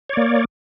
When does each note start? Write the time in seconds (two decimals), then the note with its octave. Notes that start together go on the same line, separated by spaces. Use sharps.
0.09 C#5
0.13 D5
0.17 A#3